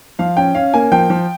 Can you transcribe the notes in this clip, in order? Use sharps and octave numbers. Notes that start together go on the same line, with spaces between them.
F3 F5
C#4 G5
C#4 F5
A#3 G#5
F3 G5
F3